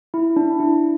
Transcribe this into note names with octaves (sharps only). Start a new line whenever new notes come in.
E4
D4
E4